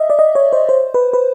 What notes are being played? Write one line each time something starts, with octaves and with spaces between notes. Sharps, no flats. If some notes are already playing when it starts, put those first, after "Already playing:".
Already playing: D#5 E5
D5
D#5
C#5
C5
C5
B4
B4